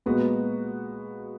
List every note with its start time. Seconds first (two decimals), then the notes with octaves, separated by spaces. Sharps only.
0.06 A#2 G#3 B3 F#4